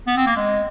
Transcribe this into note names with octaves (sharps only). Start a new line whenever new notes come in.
B3
C4
A#3
G#3